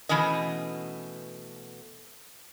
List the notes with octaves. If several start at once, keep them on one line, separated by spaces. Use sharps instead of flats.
B2 E3 A3 C#4 D#5